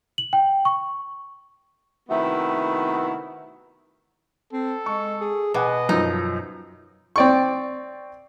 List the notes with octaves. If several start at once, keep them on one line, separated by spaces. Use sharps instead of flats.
F#7
G5
C#6
C3 D#3 A3 B3 E4 F#4
C4 A4
G#3 C#6
G#4
B2 B4 D#5 F#5 G#5 D6
F#2 F3 D#4
C4 D5 C#6